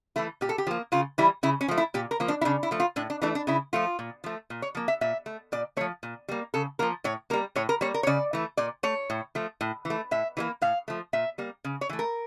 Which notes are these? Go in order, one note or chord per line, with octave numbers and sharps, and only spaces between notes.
E3 A3 E4
A#2 G4
A4
G4
F3 A#3
C#3 F4
E3 G3 E4
C#3 E4
C#4
F3 A3
E4
A#2 G4
A#4
F3 A#3
D4
E4
C#3 D4
E4
F3 A3
F4
A2 D4
D4
E3 A3 D4
D4
C#3 E4
F3 A3 F4
A#2
F3 A3
A#2
C#5
F3 A#3
E5
A#2 E5
A3
A#2 D5
F3 A3 C#5
A#2
G3 A#3
C#3 A4
F3 A#3 A#4
A2 C#5
G3 A#3 A#4
A2 C#5
A#4
G3 A#3 C#5
A#4
C#5
C#3 D5
E3 A3
A#2 D5
A3 C#5
A2
F3 A3
A2
E3
A3
A2 E5
E3 G3 A#3
A2 F5
F3 A3
A#2 E5
G3 A#3
C#3
C#5
E3 A3
A#4